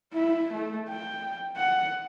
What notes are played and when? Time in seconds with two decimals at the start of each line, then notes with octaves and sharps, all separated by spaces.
0.13 E4
0.53 A3
0.89 G5
1.57 F#5